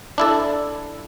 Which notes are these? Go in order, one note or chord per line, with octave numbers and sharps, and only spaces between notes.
D4 E4 A4